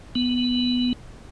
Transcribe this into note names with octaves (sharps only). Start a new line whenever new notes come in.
B3